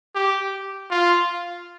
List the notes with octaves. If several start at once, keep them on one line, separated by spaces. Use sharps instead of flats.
G4
F4